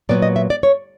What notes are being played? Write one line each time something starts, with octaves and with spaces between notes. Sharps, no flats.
A#2 F#3 B3 D5
D#5
E5
D5
C#5